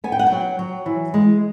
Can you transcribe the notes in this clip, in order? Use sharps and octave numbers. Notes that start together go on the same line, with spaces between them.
B3 G#5
G5
F#5
G5
F#3
F#3
E3
G#3